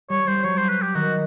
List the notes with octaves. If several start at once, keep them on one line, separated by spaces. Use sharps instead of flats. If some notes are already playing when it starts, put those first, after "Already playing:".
G3 C#5
G3 C5
G3
F#3 C#5
C5
B4
G4
D#3 F#4